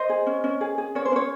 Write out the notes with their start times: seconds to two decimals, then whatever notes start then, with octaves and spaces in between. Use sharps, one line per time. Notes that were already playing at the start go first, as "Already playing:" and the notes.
Already playing: C5 D#5
0.09 G#4
0.26 C#4
0.44 C#4
0.61 G#4
0.78 G#4
0.95 C#4 C#5
1.05 C5
1.12 C#4 C#5